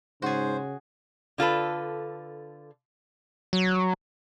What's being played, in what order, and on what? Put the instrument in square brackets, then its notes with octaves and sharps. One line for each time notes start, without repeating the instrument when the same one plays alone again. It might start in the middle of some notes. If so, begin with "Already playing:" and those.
[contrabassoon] G#2 [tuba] C#3 [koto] F#4 G#4 [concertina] C5
[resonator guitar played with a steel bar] D3 F4 A4 B4
[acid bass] F#3